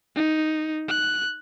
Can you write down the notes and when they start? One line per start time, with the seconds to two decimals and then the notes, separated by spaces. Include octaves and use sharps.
0.16 D#4
0.89 F#6